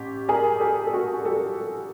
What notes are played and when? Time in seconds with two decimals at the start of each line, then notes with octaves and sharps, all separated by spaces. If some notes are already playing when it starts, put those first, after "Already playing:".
Already playing: A1 G4
0.28 G#4 A#4
0.60 G4 A4
0.86 A4
0.93 F#4 G#4
1.25 G4 A4